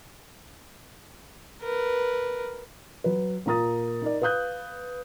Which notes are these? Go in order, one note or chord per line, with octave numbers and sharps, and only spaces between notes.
A#4 B4
F#3 B4
A#2 A#3 A#5 D#6 A6
D#4 A#4 D5
B4 F5 D#6 F#6 G6